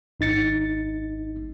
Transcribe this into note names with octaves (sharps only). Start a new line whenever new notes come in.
G#1 D#4 A6 C#7